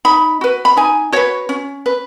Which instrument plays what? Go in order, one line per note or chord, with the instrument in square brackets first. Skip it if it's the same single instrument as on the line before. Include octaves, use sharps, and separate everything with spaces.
[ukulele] D#4 B5
F#4 B4
B5
D#4 G#5
F#4 B4 C#5
C#4
B4